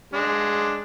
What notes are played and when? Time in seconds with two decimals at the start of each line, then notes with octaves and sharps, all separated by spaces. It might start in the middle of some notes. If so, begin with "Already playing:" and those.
0.13 G#3 D4